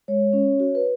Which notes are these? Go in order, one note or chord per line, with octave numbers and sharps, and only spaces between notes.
G#3 C#5
C#4
F#4
B4